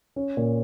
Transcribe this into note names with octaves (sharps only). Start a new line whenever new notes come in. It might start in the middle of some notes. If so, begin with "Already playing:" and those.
C#4
A#2